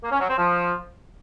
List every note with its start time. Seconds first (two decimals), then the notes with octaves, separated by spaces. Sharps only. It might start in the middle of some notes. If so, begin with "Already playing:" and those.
0.02 A#3
0.11 C#4
0.20 F#3
0.29 C4
0.37 F3